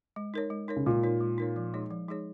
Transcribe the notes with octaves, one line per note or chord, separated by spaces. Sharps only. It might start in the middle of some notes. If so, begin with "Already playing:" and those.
G#3
D#4 A#4 C#5
G#3
D#4 A#4 C#5
C#3
A#2 G#3
D#4 A#4 C#5
G#3
D#4 A#4 C#5
F3
G#3 D#4 G#4 C#5
F3
G#3 D#4 G#4 C#5